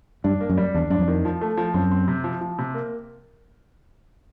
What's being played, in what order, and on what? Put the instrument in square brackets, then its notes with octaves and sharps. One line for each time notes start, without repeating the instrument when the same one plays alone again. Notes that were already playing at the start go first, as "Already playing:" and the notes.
[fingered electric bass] G2 [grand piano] D4
[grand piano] A#3
[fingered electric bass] F#2
[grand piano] G3
[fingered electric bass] E2 [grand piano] D4
[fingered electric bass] F#2 [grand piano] D4
[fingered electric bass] F2
[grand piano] D#3
F3
A3
F3
[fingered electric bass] F#2 [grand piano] C4
[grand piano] C4
C3
F3
F3
C3
A#3